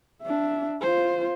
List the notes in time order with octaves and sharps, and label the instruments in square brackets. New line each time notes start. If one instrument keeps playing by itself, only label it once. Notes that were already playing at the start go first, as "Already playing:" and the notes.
[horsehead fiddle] D4 E5
F4 C5